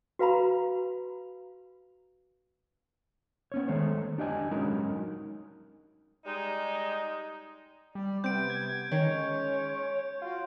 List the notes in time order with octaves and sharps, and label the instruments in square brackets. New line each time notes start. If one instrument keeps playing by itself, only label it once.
[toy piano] F#4 B4 F5 A#5 B5
[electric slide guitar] B3 C#4 C#5
D#3 G#3 A3 C5 C#5
D4 G4 D#5 G#5
F#3 G#3 C#4 D#4 A#4
[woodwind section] G3 G#3 D#4
[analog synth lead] G3 [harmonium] D5
[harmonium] C3 B3 [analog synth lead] G3 [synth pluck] C4 [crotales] G6 D7
[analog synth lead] G#6
[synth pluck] D#3 [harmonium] G#3 C#4 [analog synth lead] C#5
[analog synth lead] F4 [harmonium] F#4